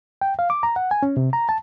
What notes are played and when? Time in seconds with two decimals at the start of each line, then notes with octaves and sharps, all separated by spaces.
0.21 G5
0.39 F5
0.50 D6
0.63 A#5
0.76 F#5
0.91 G#5
1.03 C#4
1.17 C3
1.33 A#5
1.49 A5